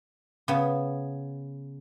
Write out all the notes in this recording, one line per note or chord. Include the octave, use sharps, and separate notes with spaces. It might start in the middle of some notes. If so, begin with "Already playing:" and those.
C#3 B3